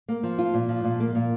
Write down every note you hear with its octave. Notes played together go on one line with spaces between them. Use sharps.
A#3
F3
F4
A#2
F3
A#2
A#3
A#2